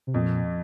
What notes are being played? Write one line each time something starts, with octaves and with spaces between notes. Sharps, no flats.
C3
F2 A#2